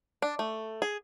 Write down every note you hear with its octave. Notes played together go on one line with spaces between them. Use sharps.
D4
A3
G#4